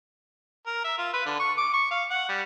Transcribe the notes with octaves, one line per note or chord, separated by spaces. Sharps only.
A#4
E5
F4
B4
D3
C#6
D6
C#6
F5
F#5
G3